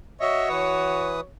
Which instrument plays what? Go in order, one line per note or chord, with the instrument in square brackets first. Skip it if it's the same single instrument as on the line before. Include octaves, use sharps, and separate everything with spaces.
[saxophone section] F#4 C#5 [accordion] D#5 E5
[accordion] E3 B4 D#6